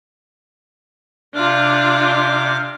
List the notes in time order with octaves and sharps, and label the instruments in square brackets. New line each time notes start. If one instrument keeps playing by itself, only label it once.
[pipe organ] C3 D6 F6 [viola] D4 F4